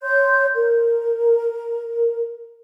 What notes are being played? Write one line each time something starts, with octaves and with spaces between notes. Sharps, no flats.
C#5 C6 G6
A#4